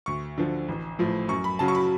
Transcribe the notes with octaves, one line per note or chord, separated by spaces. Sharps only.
D2 C#6
D3 F3
A1
A2 F3
F#2 C#6
B5
C#3 F#3 A5
C#6
B5